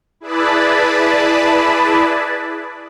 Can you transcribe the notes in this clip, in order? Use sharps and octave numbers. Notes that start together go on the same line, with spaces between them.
E4 G#4 B4 D5 A5 B5